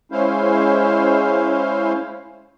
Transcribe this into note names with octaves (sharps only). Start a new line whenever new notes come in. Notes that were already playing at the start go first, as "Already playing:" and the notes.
G#3 C#4 E4 C5 F5